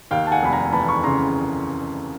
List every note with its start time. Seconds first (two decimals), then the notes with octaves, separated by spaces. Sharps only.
0.11 D#2 F5 G5
0.27 A5
0.32 F#5 G#5
0.42 F1 B5
0.53 G#5 A#5
0.73 E3 A5 B5
0.88 B5 C#6
1.04 C#3 A#5 C6